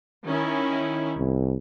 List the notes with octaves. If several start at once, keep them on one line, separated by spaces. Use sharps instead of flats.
D#3 C#4 E4
C2